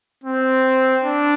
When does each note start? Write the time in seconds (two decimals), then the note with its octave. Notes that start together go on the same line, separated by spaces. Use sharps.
0.24 C4
1.04 D4